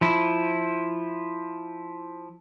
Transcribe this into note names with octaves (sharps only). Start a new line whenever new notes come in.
F3 E4